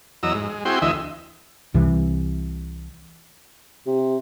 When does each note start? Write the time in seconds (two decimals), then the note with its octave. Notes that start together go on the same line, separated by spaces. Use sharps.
0.23 E2 F#3 D#5 A#5 E6
0.34 G#2
0.49 G#3
0.65 C4 E4 F#4 G#4 G5 C6
0.82 D2 E3 D#5 E5
1.74 C2 C3 E3
3.86 C3